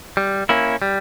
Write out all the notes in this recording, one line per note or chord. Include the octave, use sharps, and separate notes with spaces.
G3
A#3 C#4 E4
G3